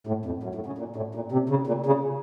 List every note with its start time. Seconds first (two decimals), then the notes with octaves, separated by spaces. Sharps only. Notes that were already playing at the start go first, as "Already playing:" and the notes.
0.07 A2
0.25 F2
0.43 F#2
0.55 A2
0.66 C#3
0.78 A#2
0.96 A2
1.15 A#2
1.32 C3
1.49 C#3
1.67 A#2
1.86 C#3